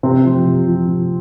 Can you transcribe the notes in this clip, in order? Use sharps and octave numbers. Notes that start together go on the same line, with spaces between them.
C3 C4
F3
C3
F3
C3